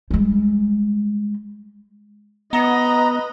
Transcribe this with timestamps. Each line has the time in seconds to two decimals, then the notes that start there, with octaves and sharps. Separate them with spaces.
0.11 G3 G#3
2.53 B3 B4 D#5 A#5